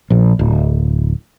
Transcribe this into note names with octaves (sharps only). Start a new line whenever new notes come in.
A#1
D1